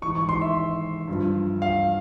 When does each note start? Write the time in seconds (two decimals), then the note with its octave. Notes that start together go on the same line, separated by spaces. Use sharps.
0.02 E3 C#6
0.07 G#2
0.15 C#6
0.29 C6
0.42 E5
1.08 G2 F3
1.62 F5